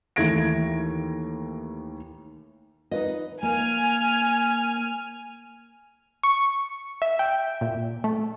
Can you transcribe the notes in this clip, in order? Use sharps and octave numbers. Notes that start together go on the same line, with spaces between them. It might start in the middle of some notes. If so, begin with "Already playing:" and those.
D#2 E3 A3 G#6 A#6 D7
D#4 B4 D#5
A#3 G#5 F6
C#6
E5
G5
A#2
A3